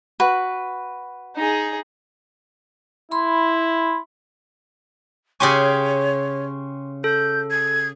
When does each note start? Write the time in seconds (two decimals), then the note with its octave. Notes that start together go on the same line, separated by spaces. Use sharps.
0.20 F#4 B4
1.36 D#4 G#4
3.11 E4 B5 C6
5.40 C#3 G4 C#5 G#5 C6 C#6
7.04 A4 G6
7.50 G#6